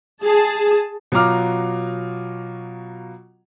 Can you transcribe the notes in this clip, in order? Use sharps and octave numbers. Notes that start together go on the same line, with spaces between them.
G#4 A5
B2 F#3 F4 A#5 D6 F6